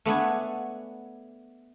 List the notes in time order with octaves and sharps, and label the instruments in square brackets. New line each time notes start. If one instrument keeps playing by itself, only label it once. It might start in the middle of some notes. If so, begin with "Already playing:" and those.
[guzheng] A3 B3 D4 G#5